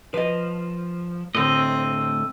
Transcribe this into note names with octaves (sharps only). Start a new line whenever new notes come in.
F3 B4 D#5
D2 A2 A3 C4 D#5